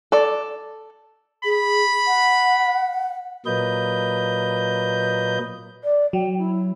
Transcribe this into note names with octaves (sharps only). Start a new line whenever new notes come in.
A4 D5
G#4 B5
F#5
A#2 F#3 A#3 B4 D#5 G6
D5
F#3 G5
E4